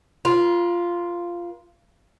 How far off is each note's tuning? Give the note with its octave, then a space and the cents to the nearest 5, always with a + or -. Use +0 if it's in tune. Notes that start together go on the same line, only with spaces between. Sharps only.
F4 -5 A#4 +45